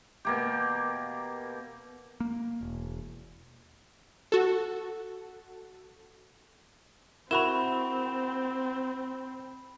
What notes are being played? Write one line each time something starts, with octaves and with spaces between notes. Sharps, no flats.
B2 A#3 G4
A#3
E1
F#4 A4
C4 E4 F#4 A#4 B5 C#6 E7